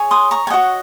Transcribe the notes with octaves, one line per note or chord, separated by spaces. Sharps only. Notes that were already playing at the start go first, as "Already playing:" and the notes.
Already playing: G#4 C#5
C6 D#6
A#5 C#6
G#5
F#4 C#5 D#5 F#5